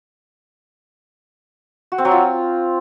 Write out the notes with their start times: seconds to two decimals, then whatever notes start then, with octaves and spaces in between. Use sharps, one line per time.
1.92 F#4
1.98 C4
2.05 F#3
2.11 F4